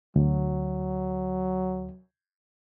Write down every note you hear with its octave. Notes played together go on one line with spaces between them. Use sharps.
D2 F#3